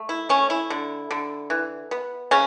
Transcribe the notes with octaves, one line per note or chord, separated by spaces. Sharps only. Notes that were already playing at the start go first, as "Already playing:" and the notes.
Already playing: A3
E4
A3 C#4
E4
D3
D3
E3
B3
C#3 C#4